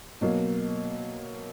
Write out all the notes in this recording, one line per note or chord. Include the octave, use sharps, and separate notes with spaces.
B2 F#3 A#3